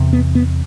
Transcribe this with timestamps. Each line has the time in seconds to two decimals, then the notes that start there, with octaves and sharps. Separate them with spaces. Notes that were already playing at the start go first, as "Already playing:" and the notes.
Already playing: E2 C3
0.13 B3
0.35 B3